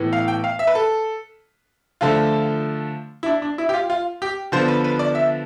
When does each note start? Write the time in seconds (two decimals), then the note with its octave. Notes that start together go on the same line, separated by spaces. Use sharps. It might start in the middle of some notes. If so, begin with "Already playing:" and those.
Already playing: A2 E3 B3
0.13 F5
0.28 G5
0.44 F5
0.59 E5
0.67 B4
0.75 A4
2.01 D3 F3 A3 F4
3.23 E4
3.26 D4
3.42 D4
3.58 E4
3.69 G4
3.74 F4
3.90 F4
4.22 G4
4.52 D3 F3 B3 C5
4.68 B4
4.84 B4
4.99 D5
5.15 E5